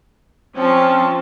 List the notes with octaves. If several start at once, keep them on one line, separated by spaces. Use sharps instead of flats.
F3 C4 C#4 A5